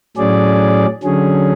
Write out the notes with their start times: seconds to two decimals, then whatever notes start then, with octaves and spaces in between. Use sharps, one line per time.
0.17 A2 F#3 C#4 G#4 D5
1.03 D3 F#3 C#4 G#4